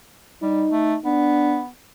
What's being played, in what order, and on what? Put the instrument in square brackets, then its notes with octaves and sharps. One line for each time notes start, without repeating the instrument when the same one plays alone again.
[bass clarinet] G3 [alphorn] D#4
[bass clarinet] A3
[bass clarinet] B3 [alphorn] D4